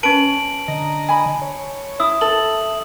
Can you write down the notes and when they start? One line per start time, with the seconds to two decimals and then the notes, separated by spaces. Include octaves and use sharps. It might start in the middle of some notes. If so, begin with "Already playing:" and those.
0.03 C#4 B4 A5 D7 F#7
0.68 D3 D#5 A#5
1.09 G#5 B5
1.42 C#5
2.00 E4 E5 D#6 E6
2.21 A4 F#7